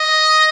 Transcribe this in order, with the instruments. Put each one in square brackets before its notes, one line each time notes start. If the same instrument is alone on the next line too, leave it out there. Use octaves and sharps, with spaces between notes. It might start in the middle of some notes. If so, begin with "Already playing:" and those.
Already playing: [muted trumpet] D#5